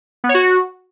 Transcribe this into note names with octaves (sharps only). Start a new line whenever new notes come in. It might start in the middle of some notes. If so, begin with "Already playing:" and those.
B3
C#5
F#4